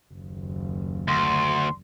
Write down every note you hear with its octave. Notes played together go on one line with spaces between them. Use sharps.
F#1 D#2
D2 C6